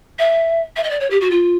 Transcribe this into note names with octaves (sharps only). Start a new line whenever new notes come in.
E5
E5
D#5
D5
C#5
G4
F#4
F4